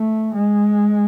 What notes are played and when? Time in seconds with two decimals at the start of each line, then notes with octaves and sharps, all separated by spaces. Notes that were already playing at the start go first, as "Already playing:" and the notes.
Already playing: A3
0.34 G#3